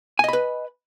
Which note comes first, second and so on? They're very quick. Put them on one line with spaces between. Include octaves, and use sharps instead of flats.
G#5 D#5 B5 B4